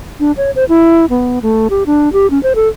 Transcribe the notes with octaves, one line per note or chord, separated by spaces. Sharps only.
D4
C#5
C5
E4
B3
A3
G4
D4
G4
C#4
C5
A4